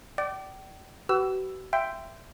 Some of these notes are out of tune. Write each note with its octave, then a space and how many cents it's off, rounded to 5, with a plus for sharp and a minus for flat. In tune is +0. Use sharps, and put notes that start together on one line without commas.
D5 +0 G5 -40
F#4 +45 B4 +20 E6 +5
E5 +10 G5 +0 C6 -15